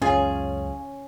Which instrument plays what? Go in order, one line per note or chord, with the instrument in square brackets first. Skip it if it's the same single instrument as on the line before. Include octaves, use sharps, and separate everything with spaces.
[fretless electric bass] C#2 F#2 C#3 [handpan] C#4 [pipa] F4 G#4